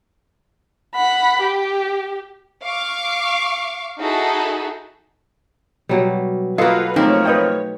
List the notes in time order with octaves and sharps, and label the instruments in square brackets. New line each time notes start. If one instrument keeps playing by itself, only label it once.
[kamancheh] F#5 B5
G4
[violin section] F5 C#6 D6
D#4 E4 F#4 G#4 A4
[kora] B2 F#3 G3
[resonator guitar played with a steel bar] A#3 F4 [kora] F#4 A4 [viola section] B4 F5 [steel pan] D#5
[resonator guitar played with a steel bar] F3 A#3 C4 [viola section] A3 C#5 [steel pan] D#4
[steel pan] B4 D#5 G5